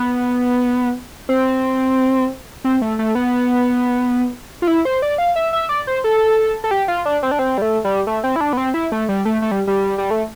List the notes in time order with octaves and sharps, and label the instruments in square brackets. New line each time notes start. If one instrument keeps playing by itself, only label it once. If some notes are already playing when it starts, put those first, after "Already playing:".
Already playing: [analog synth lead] B3
C4
C4
A3
A3
B3
F4
E4
C5
D5
F5
E5
E5
D5
C5
A4
A4
G4
F4
D4
C4
D4
C4
G3
A3
G3
A3
C4
E4
D4
B3
C4
E4
A3
G3
A3
A3
G3
G3
G3
A3